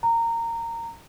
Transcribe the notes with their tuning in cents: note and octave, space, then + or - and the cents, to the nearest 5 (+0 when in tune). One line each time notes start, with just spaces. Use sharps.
A#5 -20